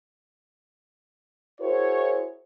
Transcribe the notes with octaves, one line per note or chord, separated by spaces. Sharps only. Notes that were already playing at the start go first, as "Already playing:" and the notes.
E4 F#4 G#4 A#4 C5 C#5